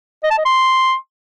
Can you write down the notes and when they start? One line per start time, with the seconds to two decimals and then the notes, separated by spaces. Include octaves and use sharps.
0.24 D#5
0.31 A5
0.38 D#5
0.45 C6